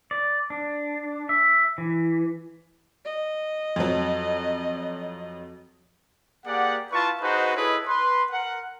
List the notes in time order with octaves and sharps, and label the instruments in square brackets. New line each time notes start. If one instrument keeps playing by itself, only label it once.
[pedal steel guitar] D5
D4
E5
E3
[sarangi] D#5
[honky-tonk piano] F2 F#3
[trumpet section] A#3 G4 G#4 D5 F#5
E4 F4 B4 A5 C#6
D#4 F#4 G#4 B4 C5 D#5
E4 G#4 A4 B4 C#5 D#5
B4 C6
A#4 F#5